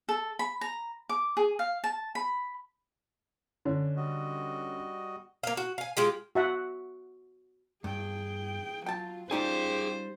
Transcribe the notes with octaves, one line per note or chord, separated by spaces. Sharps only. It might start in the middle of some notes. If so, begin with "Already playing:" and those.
A4
B5
A#5
D6
G#4
F5
A5
B5
D3 C#4 D4
G3 F#4 D#5
A#3 F5
F#4
F5 G#5
G#3 F4 G4
F#4 E5 F#5
G2 G#4 G5
F#3 F4 G5 A5
G3 C#4 D#4 F4 G#4 C5 G5 G#5